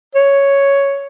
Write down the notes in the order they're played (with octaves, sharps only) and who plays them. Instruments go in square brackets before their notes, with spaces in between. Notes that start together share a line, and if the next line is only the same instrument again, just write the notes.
[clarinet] C#5